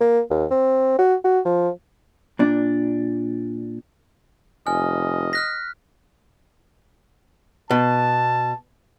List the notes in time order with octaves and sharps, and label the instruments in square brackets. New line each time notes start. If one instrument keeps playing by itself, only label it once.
[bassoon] A#3
D#2
C4
F#4
F#4
F3
[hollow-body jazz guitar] A#2 D4
[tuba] F1 [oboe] D#5 [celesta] G#5 [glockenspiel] F6
[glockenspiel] F6 F#6 B6 [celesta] A#6
[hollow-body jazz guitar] B2 [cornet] A5